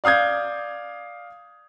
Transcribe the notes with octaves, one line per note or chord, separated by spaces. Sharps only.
D5 F5 D#6 G6 G#6